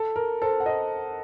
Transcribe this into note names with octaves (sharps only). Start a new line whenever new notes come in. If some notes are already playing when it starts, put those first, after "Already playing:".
Already playing: A4
A#4
A4 C5
F#5
C5 D#5